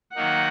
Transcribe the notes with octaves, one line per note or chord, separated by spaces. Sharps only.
D#3 F#3 A#3 D#4 F#5